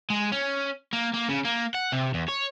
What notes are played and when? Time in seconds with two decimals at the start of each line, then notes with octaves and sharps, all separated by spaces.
0.10 G#3
0.32 C#4
0.93 A#3
1.14 A#3
1.29 C#3
1.45 A#3
1.74 F#5
1.92 C3
2.14 E2
2.28 C#5